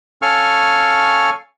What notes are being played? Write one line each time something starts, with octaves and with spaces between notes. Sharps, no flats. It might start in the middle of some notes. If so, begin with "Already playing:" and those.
C#4 A4 F5 G#5 C#6 F6